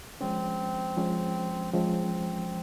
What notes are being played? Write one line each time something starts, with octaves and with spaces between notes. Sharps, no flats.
F3 G#3 C4 C#4
F3 G#3 C#4
F3 G#3 C4 C#4